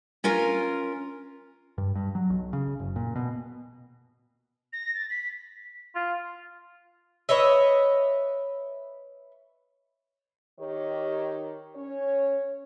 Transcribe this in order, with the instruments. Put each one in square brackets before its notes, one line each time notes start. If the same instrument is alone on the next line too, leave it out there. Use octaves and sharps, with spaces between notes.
[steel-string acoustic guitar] C#4 F4 A#4 G#5
[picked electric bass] G2
G2
F#3
B1
C#3
F#1
A#2
B2
[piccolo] A#6
A6
B6
[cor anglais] F4
[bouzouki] B4 C#5 D#5 E5
[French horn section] D#3 G4 C#5
C#4 C#5